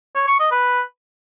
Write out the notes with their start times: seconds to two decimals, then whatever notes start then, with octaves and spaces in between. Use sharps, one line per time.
0.15 C#5
0.27 C#6
0.39 D#5
0.51 B4